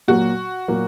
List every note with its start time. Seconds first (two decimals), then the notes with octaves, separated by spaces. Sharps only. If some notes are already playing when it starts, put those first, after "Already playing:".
0.08 A#2 F#3 A#3 F#4
0.68 A#2 F#3 A#3